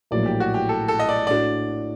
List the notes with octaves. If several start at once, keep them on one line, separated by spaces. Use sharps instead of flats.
A#1 A2 F#3 A#3 D5
G4
F#4
G4
A4
A4
D#5
D5
A2 A3 D4 F#4 D5